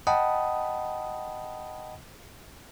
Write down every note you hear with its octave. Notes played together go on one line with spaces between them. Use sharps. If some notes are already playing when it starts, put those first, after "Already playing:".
D#5 F#5 G5 A5 B5 D#6